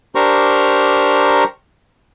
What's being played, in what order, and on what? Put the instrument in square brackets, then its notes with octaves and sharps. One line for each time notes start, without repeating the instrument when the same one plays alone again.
[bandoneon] D4 G4 A#4 C5 A#5 C#6